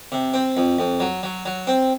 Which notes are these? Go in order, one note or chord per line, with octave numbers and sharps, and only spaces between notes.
C3
C4
F2
F2
F#3
F#3
F#3
C4